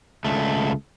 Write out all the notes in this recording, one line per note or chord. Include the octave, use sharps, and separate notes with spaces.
C#2 A3